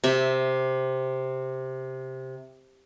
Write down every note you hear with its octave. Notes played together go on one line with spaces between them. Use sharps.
C3 E5